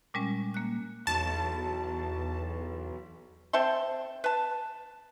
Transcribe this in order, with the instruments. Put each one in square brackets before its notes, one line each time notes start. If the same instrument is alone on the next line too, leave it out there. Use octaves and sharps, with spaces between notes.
[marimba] A#2 G3 G#3 C#4
A#3 F#6
[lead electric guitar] B1 [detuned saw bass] E2 [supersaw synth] A5
[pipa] C4 A4 E5 C6
B4 A5